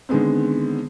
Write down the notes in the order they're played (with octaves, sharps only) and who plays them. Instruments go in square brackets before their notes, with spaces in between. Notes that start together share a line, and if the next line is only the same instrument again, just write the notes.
[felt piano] D3 D#3 G#3 B3 C4